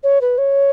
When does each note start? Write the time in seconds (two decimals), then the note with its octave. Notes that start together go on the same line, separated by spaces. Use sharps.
0.03 C#5
0.21 B4
0.38 C#5